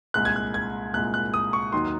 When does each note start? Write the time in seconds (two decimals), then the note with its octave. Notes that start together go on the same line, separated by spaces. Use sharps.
0.14 C2 A#2 G#3 F#6
0.25 G#6
0.36 F#6
0.54 G#6
0.94 C2 A#2 G#3 F#6
1.14 F#6
1.34 D#6
1.53 C#6
1.72 D#2 D#3 F#3 C6